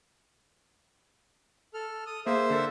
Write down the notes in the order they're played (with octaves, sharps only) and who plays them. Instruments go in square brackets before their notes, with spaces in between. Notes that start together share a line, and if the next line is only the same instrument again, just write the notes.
[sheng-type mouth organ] A4 F6
D#6
[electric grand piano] A#3 G#4 F5 [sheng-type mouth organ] C5 E5
[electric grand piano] D3 A4 A#4